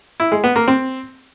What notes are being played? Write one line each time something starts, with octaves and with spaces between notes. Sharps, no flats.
E4
G#3
B3
A#3
C4